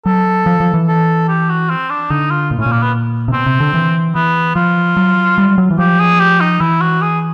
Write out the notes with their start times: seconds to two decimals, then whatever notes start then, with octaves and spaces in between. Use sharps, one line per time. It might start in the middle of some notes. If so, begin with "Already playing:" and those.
0.06 F#3 A4
0.46 F3
0.60 F3
0.74 E3
0.88 A4
1.28 G4
1.49 F#4
1.70 C4
1.90 D4
2.10 D3 D#4
2.30 F4
2.51 A#2
2.59 A2 C#4
2.66 A#2
2.71 A#3
2.82 B3
3.28 C3
3.33 B2 C4
3.46 C3
3.60 D3
3.74 E3
4.15 E3 B3
4.55 F3 F4
4.97 F#3
5.38 G3
5.58 F#3
5.71 E3
5.78 F3 G4
5.99 G#4
6.20 G4
6.40 D#4
6.61 E3 E4
6.81 F#4
7.01 G#4